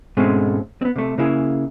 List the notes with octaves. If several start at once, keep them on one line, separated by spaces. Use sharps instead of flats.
G#2 B2 G#3 A3 C4 C#4
B3 C4
C3 A3
C#3 A#3 E4 G#4